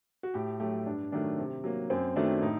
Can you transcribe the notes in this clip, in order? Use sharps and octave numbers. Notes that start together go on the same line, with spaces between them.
F#4
A2 G4
F#3 A3 G4
G2 D4
D#3 F#3 A3 D4
C3
F#3 A#3
F#2 C4
D#3 F#3 A3 D4
A2 D#4